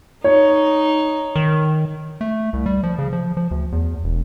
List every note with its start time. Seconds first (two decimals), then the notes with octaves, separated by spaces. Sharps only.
0.24 D#4 C#5
1.36 D#3
2.21 A3
2.53 C2
2.66 G3
2.83 F3
2.99 C#3
3.13 F3
3.37 F3
3.51 D2
3.72 E2
4.04 E1